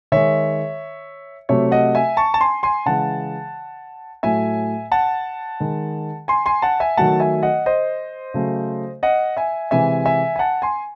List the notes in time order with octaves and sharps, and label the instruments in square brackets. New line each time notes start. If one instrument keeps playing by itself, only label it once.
[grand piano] D#3 G#3 C#5 E5
C3 F#3 A3 C#5 E5
D#5 F#5
E5 G#5
A5 C#6
A5
G#5 C6
G#5 C6
C#3 E3 G#3 F#5 A5
A2 F#3 A3 E5 G#5
F#5 A5
D#3 G#3
G#5 C6
G#5 C6
F#5 A5
E5 G#5
D#3 F#3 A3 F#5 A5
E5 G#5
D#5 F#5
C5 D#5
C#3 F#3 A3
D#5 F#5
E5 G#5
C3 E3 G#3 E5 G#5
E5 G#5
G#5
F#5 A5
G#5 C6